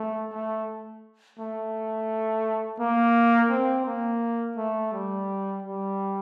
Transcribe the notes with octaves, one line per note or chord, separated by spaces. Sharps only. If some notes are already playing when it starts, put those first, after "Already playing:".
Already playing: A3
A3
A3
A#3
C4
A#3
A3
G3
G3